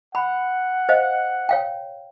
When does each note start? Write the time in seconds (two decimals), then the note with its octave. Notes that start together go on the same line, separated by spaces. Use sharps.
0.15 F#5 B5
0.89 C5 D#5 F5
1.49 C#5 F5 G5